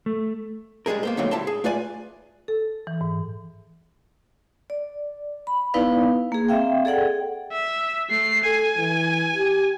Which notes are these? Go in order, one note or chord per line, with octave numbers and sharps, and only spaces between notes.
A3
G3 G#3 B3 G#4 A#4
A#3 B3 C5
D3 D#3 F#3 A3 A#3 C4
G3 E4 A5 C6
G#4
A3 F4 B4 D5 G#5
A4
E3
G#2
D5
B5
B3 D#4 E4 B4 D5 F5
A#3 G#4
C4 E5 F5 G5
G#4 A4 D5 F#5 G5
E5
A3 C7
A4 G#5
E3
G4